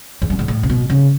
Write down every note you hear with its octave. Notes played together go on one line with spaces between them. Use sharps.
E2
F#2
G#2
A2
C#3
B2
C#3